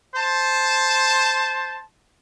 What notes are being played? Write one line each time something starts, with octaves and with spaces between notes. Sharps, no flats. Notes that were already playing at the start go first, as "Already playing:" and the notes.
C5 A5